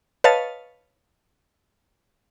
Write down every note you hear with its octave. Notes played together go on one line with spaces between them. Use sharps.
B4 C#5 D#5 F5 A5 A6